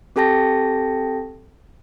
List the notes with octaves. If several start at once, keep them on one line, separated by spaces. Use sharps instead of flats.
C4 G4 A4 G5 A5 A#6